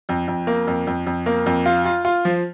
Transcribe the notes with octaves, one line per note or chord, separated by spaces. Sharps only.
F2
F2
A#3
F2
F2
F2
A#3
F2
F4
F4
F4
F3